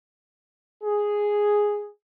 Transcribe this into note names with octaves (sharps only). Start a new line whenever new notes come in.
G#4